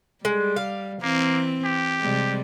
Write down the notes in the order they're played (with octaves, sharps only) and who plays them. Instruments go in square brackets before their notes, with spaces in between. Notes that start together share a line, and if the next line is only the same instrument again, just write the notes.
[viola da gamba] G3 [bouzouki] G#3
[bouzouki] F5
[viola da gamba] E3 C4 [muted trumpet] A#3
[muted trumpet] G4
[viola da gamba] C3 G3 G#3